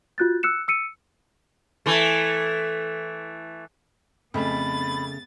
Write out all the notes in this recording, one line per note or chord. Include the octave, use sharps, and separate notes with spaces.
F4 F#4 F#6 G6 A6
E6 F#6 C#7 E7
E6 C#7 D#7
E3 A3
F2 C#3 A3 B3 B5 A6